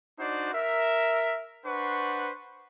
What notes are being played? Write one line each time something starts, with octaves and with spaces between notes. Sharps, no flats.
D4 D#4 F#4 C5 D5
A#4 E5
D4 B4 C5 F#5 C#6